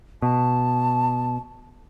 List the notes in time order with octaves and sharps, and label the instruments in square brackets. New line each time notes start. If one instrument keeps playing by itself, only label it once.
[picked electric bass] B2 [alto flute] A5